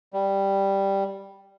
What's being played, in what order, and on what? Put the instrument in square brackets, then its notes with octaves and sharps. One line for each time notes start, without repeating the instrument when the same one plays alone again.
[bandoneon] G3